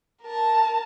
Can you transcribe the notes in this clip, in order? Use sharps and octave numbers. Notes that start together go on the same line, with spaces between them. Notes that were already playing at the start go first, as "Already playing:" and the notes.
A#4 A5